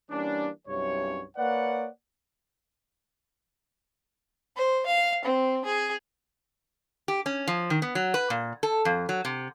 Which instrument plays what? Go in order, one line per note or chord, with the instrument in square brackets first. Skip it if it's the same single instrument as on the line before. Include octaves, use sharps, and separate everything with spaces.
[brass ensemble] E3 G3 A#3 C#4 D4
C2 G2 C3 F#3 C#4 C#5
A#3 B4 C#5 D5 F#5
[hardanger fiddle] C5
F5
C4
G#4
[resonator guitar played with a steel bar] G4
C#4
F3
D#3
B3
F#3
B4
A#2
A4
F2
F#3
C3